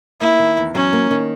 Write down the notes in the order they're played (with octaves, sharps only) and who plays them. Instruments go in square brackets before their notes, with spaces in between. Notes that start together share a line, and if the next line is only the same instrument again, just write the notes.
[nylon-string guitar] A#3 [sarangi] E4
[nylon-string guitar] D#3
E2
[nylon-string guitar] F#3 [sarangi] C#4
[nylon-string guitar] A#3
D#3